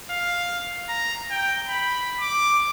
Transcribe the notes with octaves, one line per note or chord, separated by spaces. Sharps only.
F5
A#5
G5
B5
D6